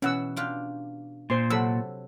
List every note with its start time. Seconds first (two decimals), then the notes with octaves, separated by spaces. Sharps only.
0.02 B2 E3 C#4 F#5 E6
0.36 D4 F4 G4
1.30 A#2 C5 C6
1.50 C3 F#3 A4 B5 E6